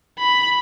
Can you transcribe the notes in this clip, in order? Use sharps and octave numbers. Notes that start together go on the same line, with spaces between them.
B5